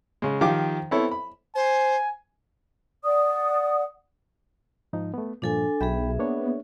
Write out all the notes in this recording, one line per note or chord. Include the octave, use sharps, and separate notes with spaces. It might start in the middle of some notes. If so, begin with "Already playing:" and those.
C#3 G#3
D#3 F3 G4 F5 D6
B3 C4 E4 A4 C#5
B5
C5 G#5
D5 F#5 D#6
G#2 F3 D#4
A3 B3
G2 A#2 F3 D4 A4 G#5
B1 G#4 E5 G5 B5
A#3 B3 D4 C#5